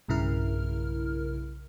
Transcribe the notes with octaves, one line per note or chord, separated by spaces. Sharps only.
B1 G2 C#3 E4 A#4 F6